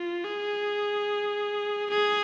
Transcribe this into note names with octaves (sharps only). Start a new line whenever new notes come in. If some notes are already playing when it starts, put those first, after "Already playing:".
Already playing: F4
G#4
G#4